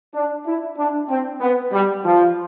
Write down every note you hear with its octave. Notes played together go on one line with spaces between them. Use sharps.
D4
E4
D4
C4
B3
G3
F3